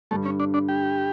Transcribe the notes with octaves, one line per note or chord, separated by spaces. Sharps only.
G2 D3 G3 A3
C#4
D4
D4
G4